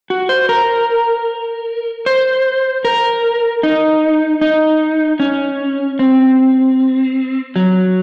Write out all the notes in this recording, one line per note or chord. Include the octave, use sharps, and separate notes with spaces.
F#4
C5
A#4
C5
A#4
D#4
D#4
C#4
C4
F#3